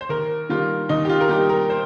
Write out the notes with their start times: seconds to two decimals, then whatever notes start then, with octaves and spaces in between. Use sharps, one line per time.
0.01 C5
0.09 D#2 A#4
0.49 D#3 G3 A#3 F4
0.89 D#2 D#4
1.05 G4
1.09 F4
1.21 A#4
1.29 D#3 G3 A#3 G4
1.49 A#4
1.70 C5